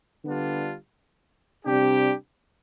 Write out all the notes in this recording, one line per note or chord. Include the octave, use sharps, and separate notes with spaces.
D3 G3 B3 D4 F4
C3 G3 D4 G4